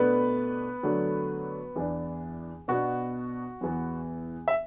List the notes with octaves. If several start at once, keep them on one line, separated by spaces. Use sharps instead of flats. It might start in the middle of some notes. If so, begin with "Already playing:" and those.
Already playing: B2 A3 B3 D4 B4
D3 F#3 A3 D4
E2 E3 B3 D4
B2 B3 D4 F#4
E2 E3 B3
E5